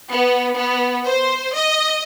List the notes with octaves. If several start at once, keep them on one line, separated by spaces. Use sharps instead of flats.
B3
B3
C5
D#5